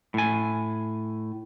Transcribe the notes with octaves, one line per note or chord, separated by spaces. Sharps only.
A2 G#5